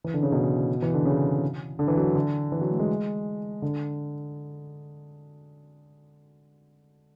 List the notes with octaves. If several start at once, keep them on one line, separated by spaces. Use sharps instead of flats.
E3
D3
C#3
B2
E3
D3
C#3
D3
E3
F#3
D3
E3
F#3
A3
G#3
D3